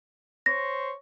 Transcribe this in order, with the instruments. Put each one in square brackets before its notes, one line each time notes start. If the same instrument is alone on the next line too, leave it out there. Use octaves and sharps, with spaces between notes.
[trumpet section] C5 C#5 [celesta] A#6